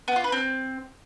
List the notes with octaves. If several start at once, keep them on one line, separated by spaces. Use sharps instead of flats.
B3
F4
B4
C4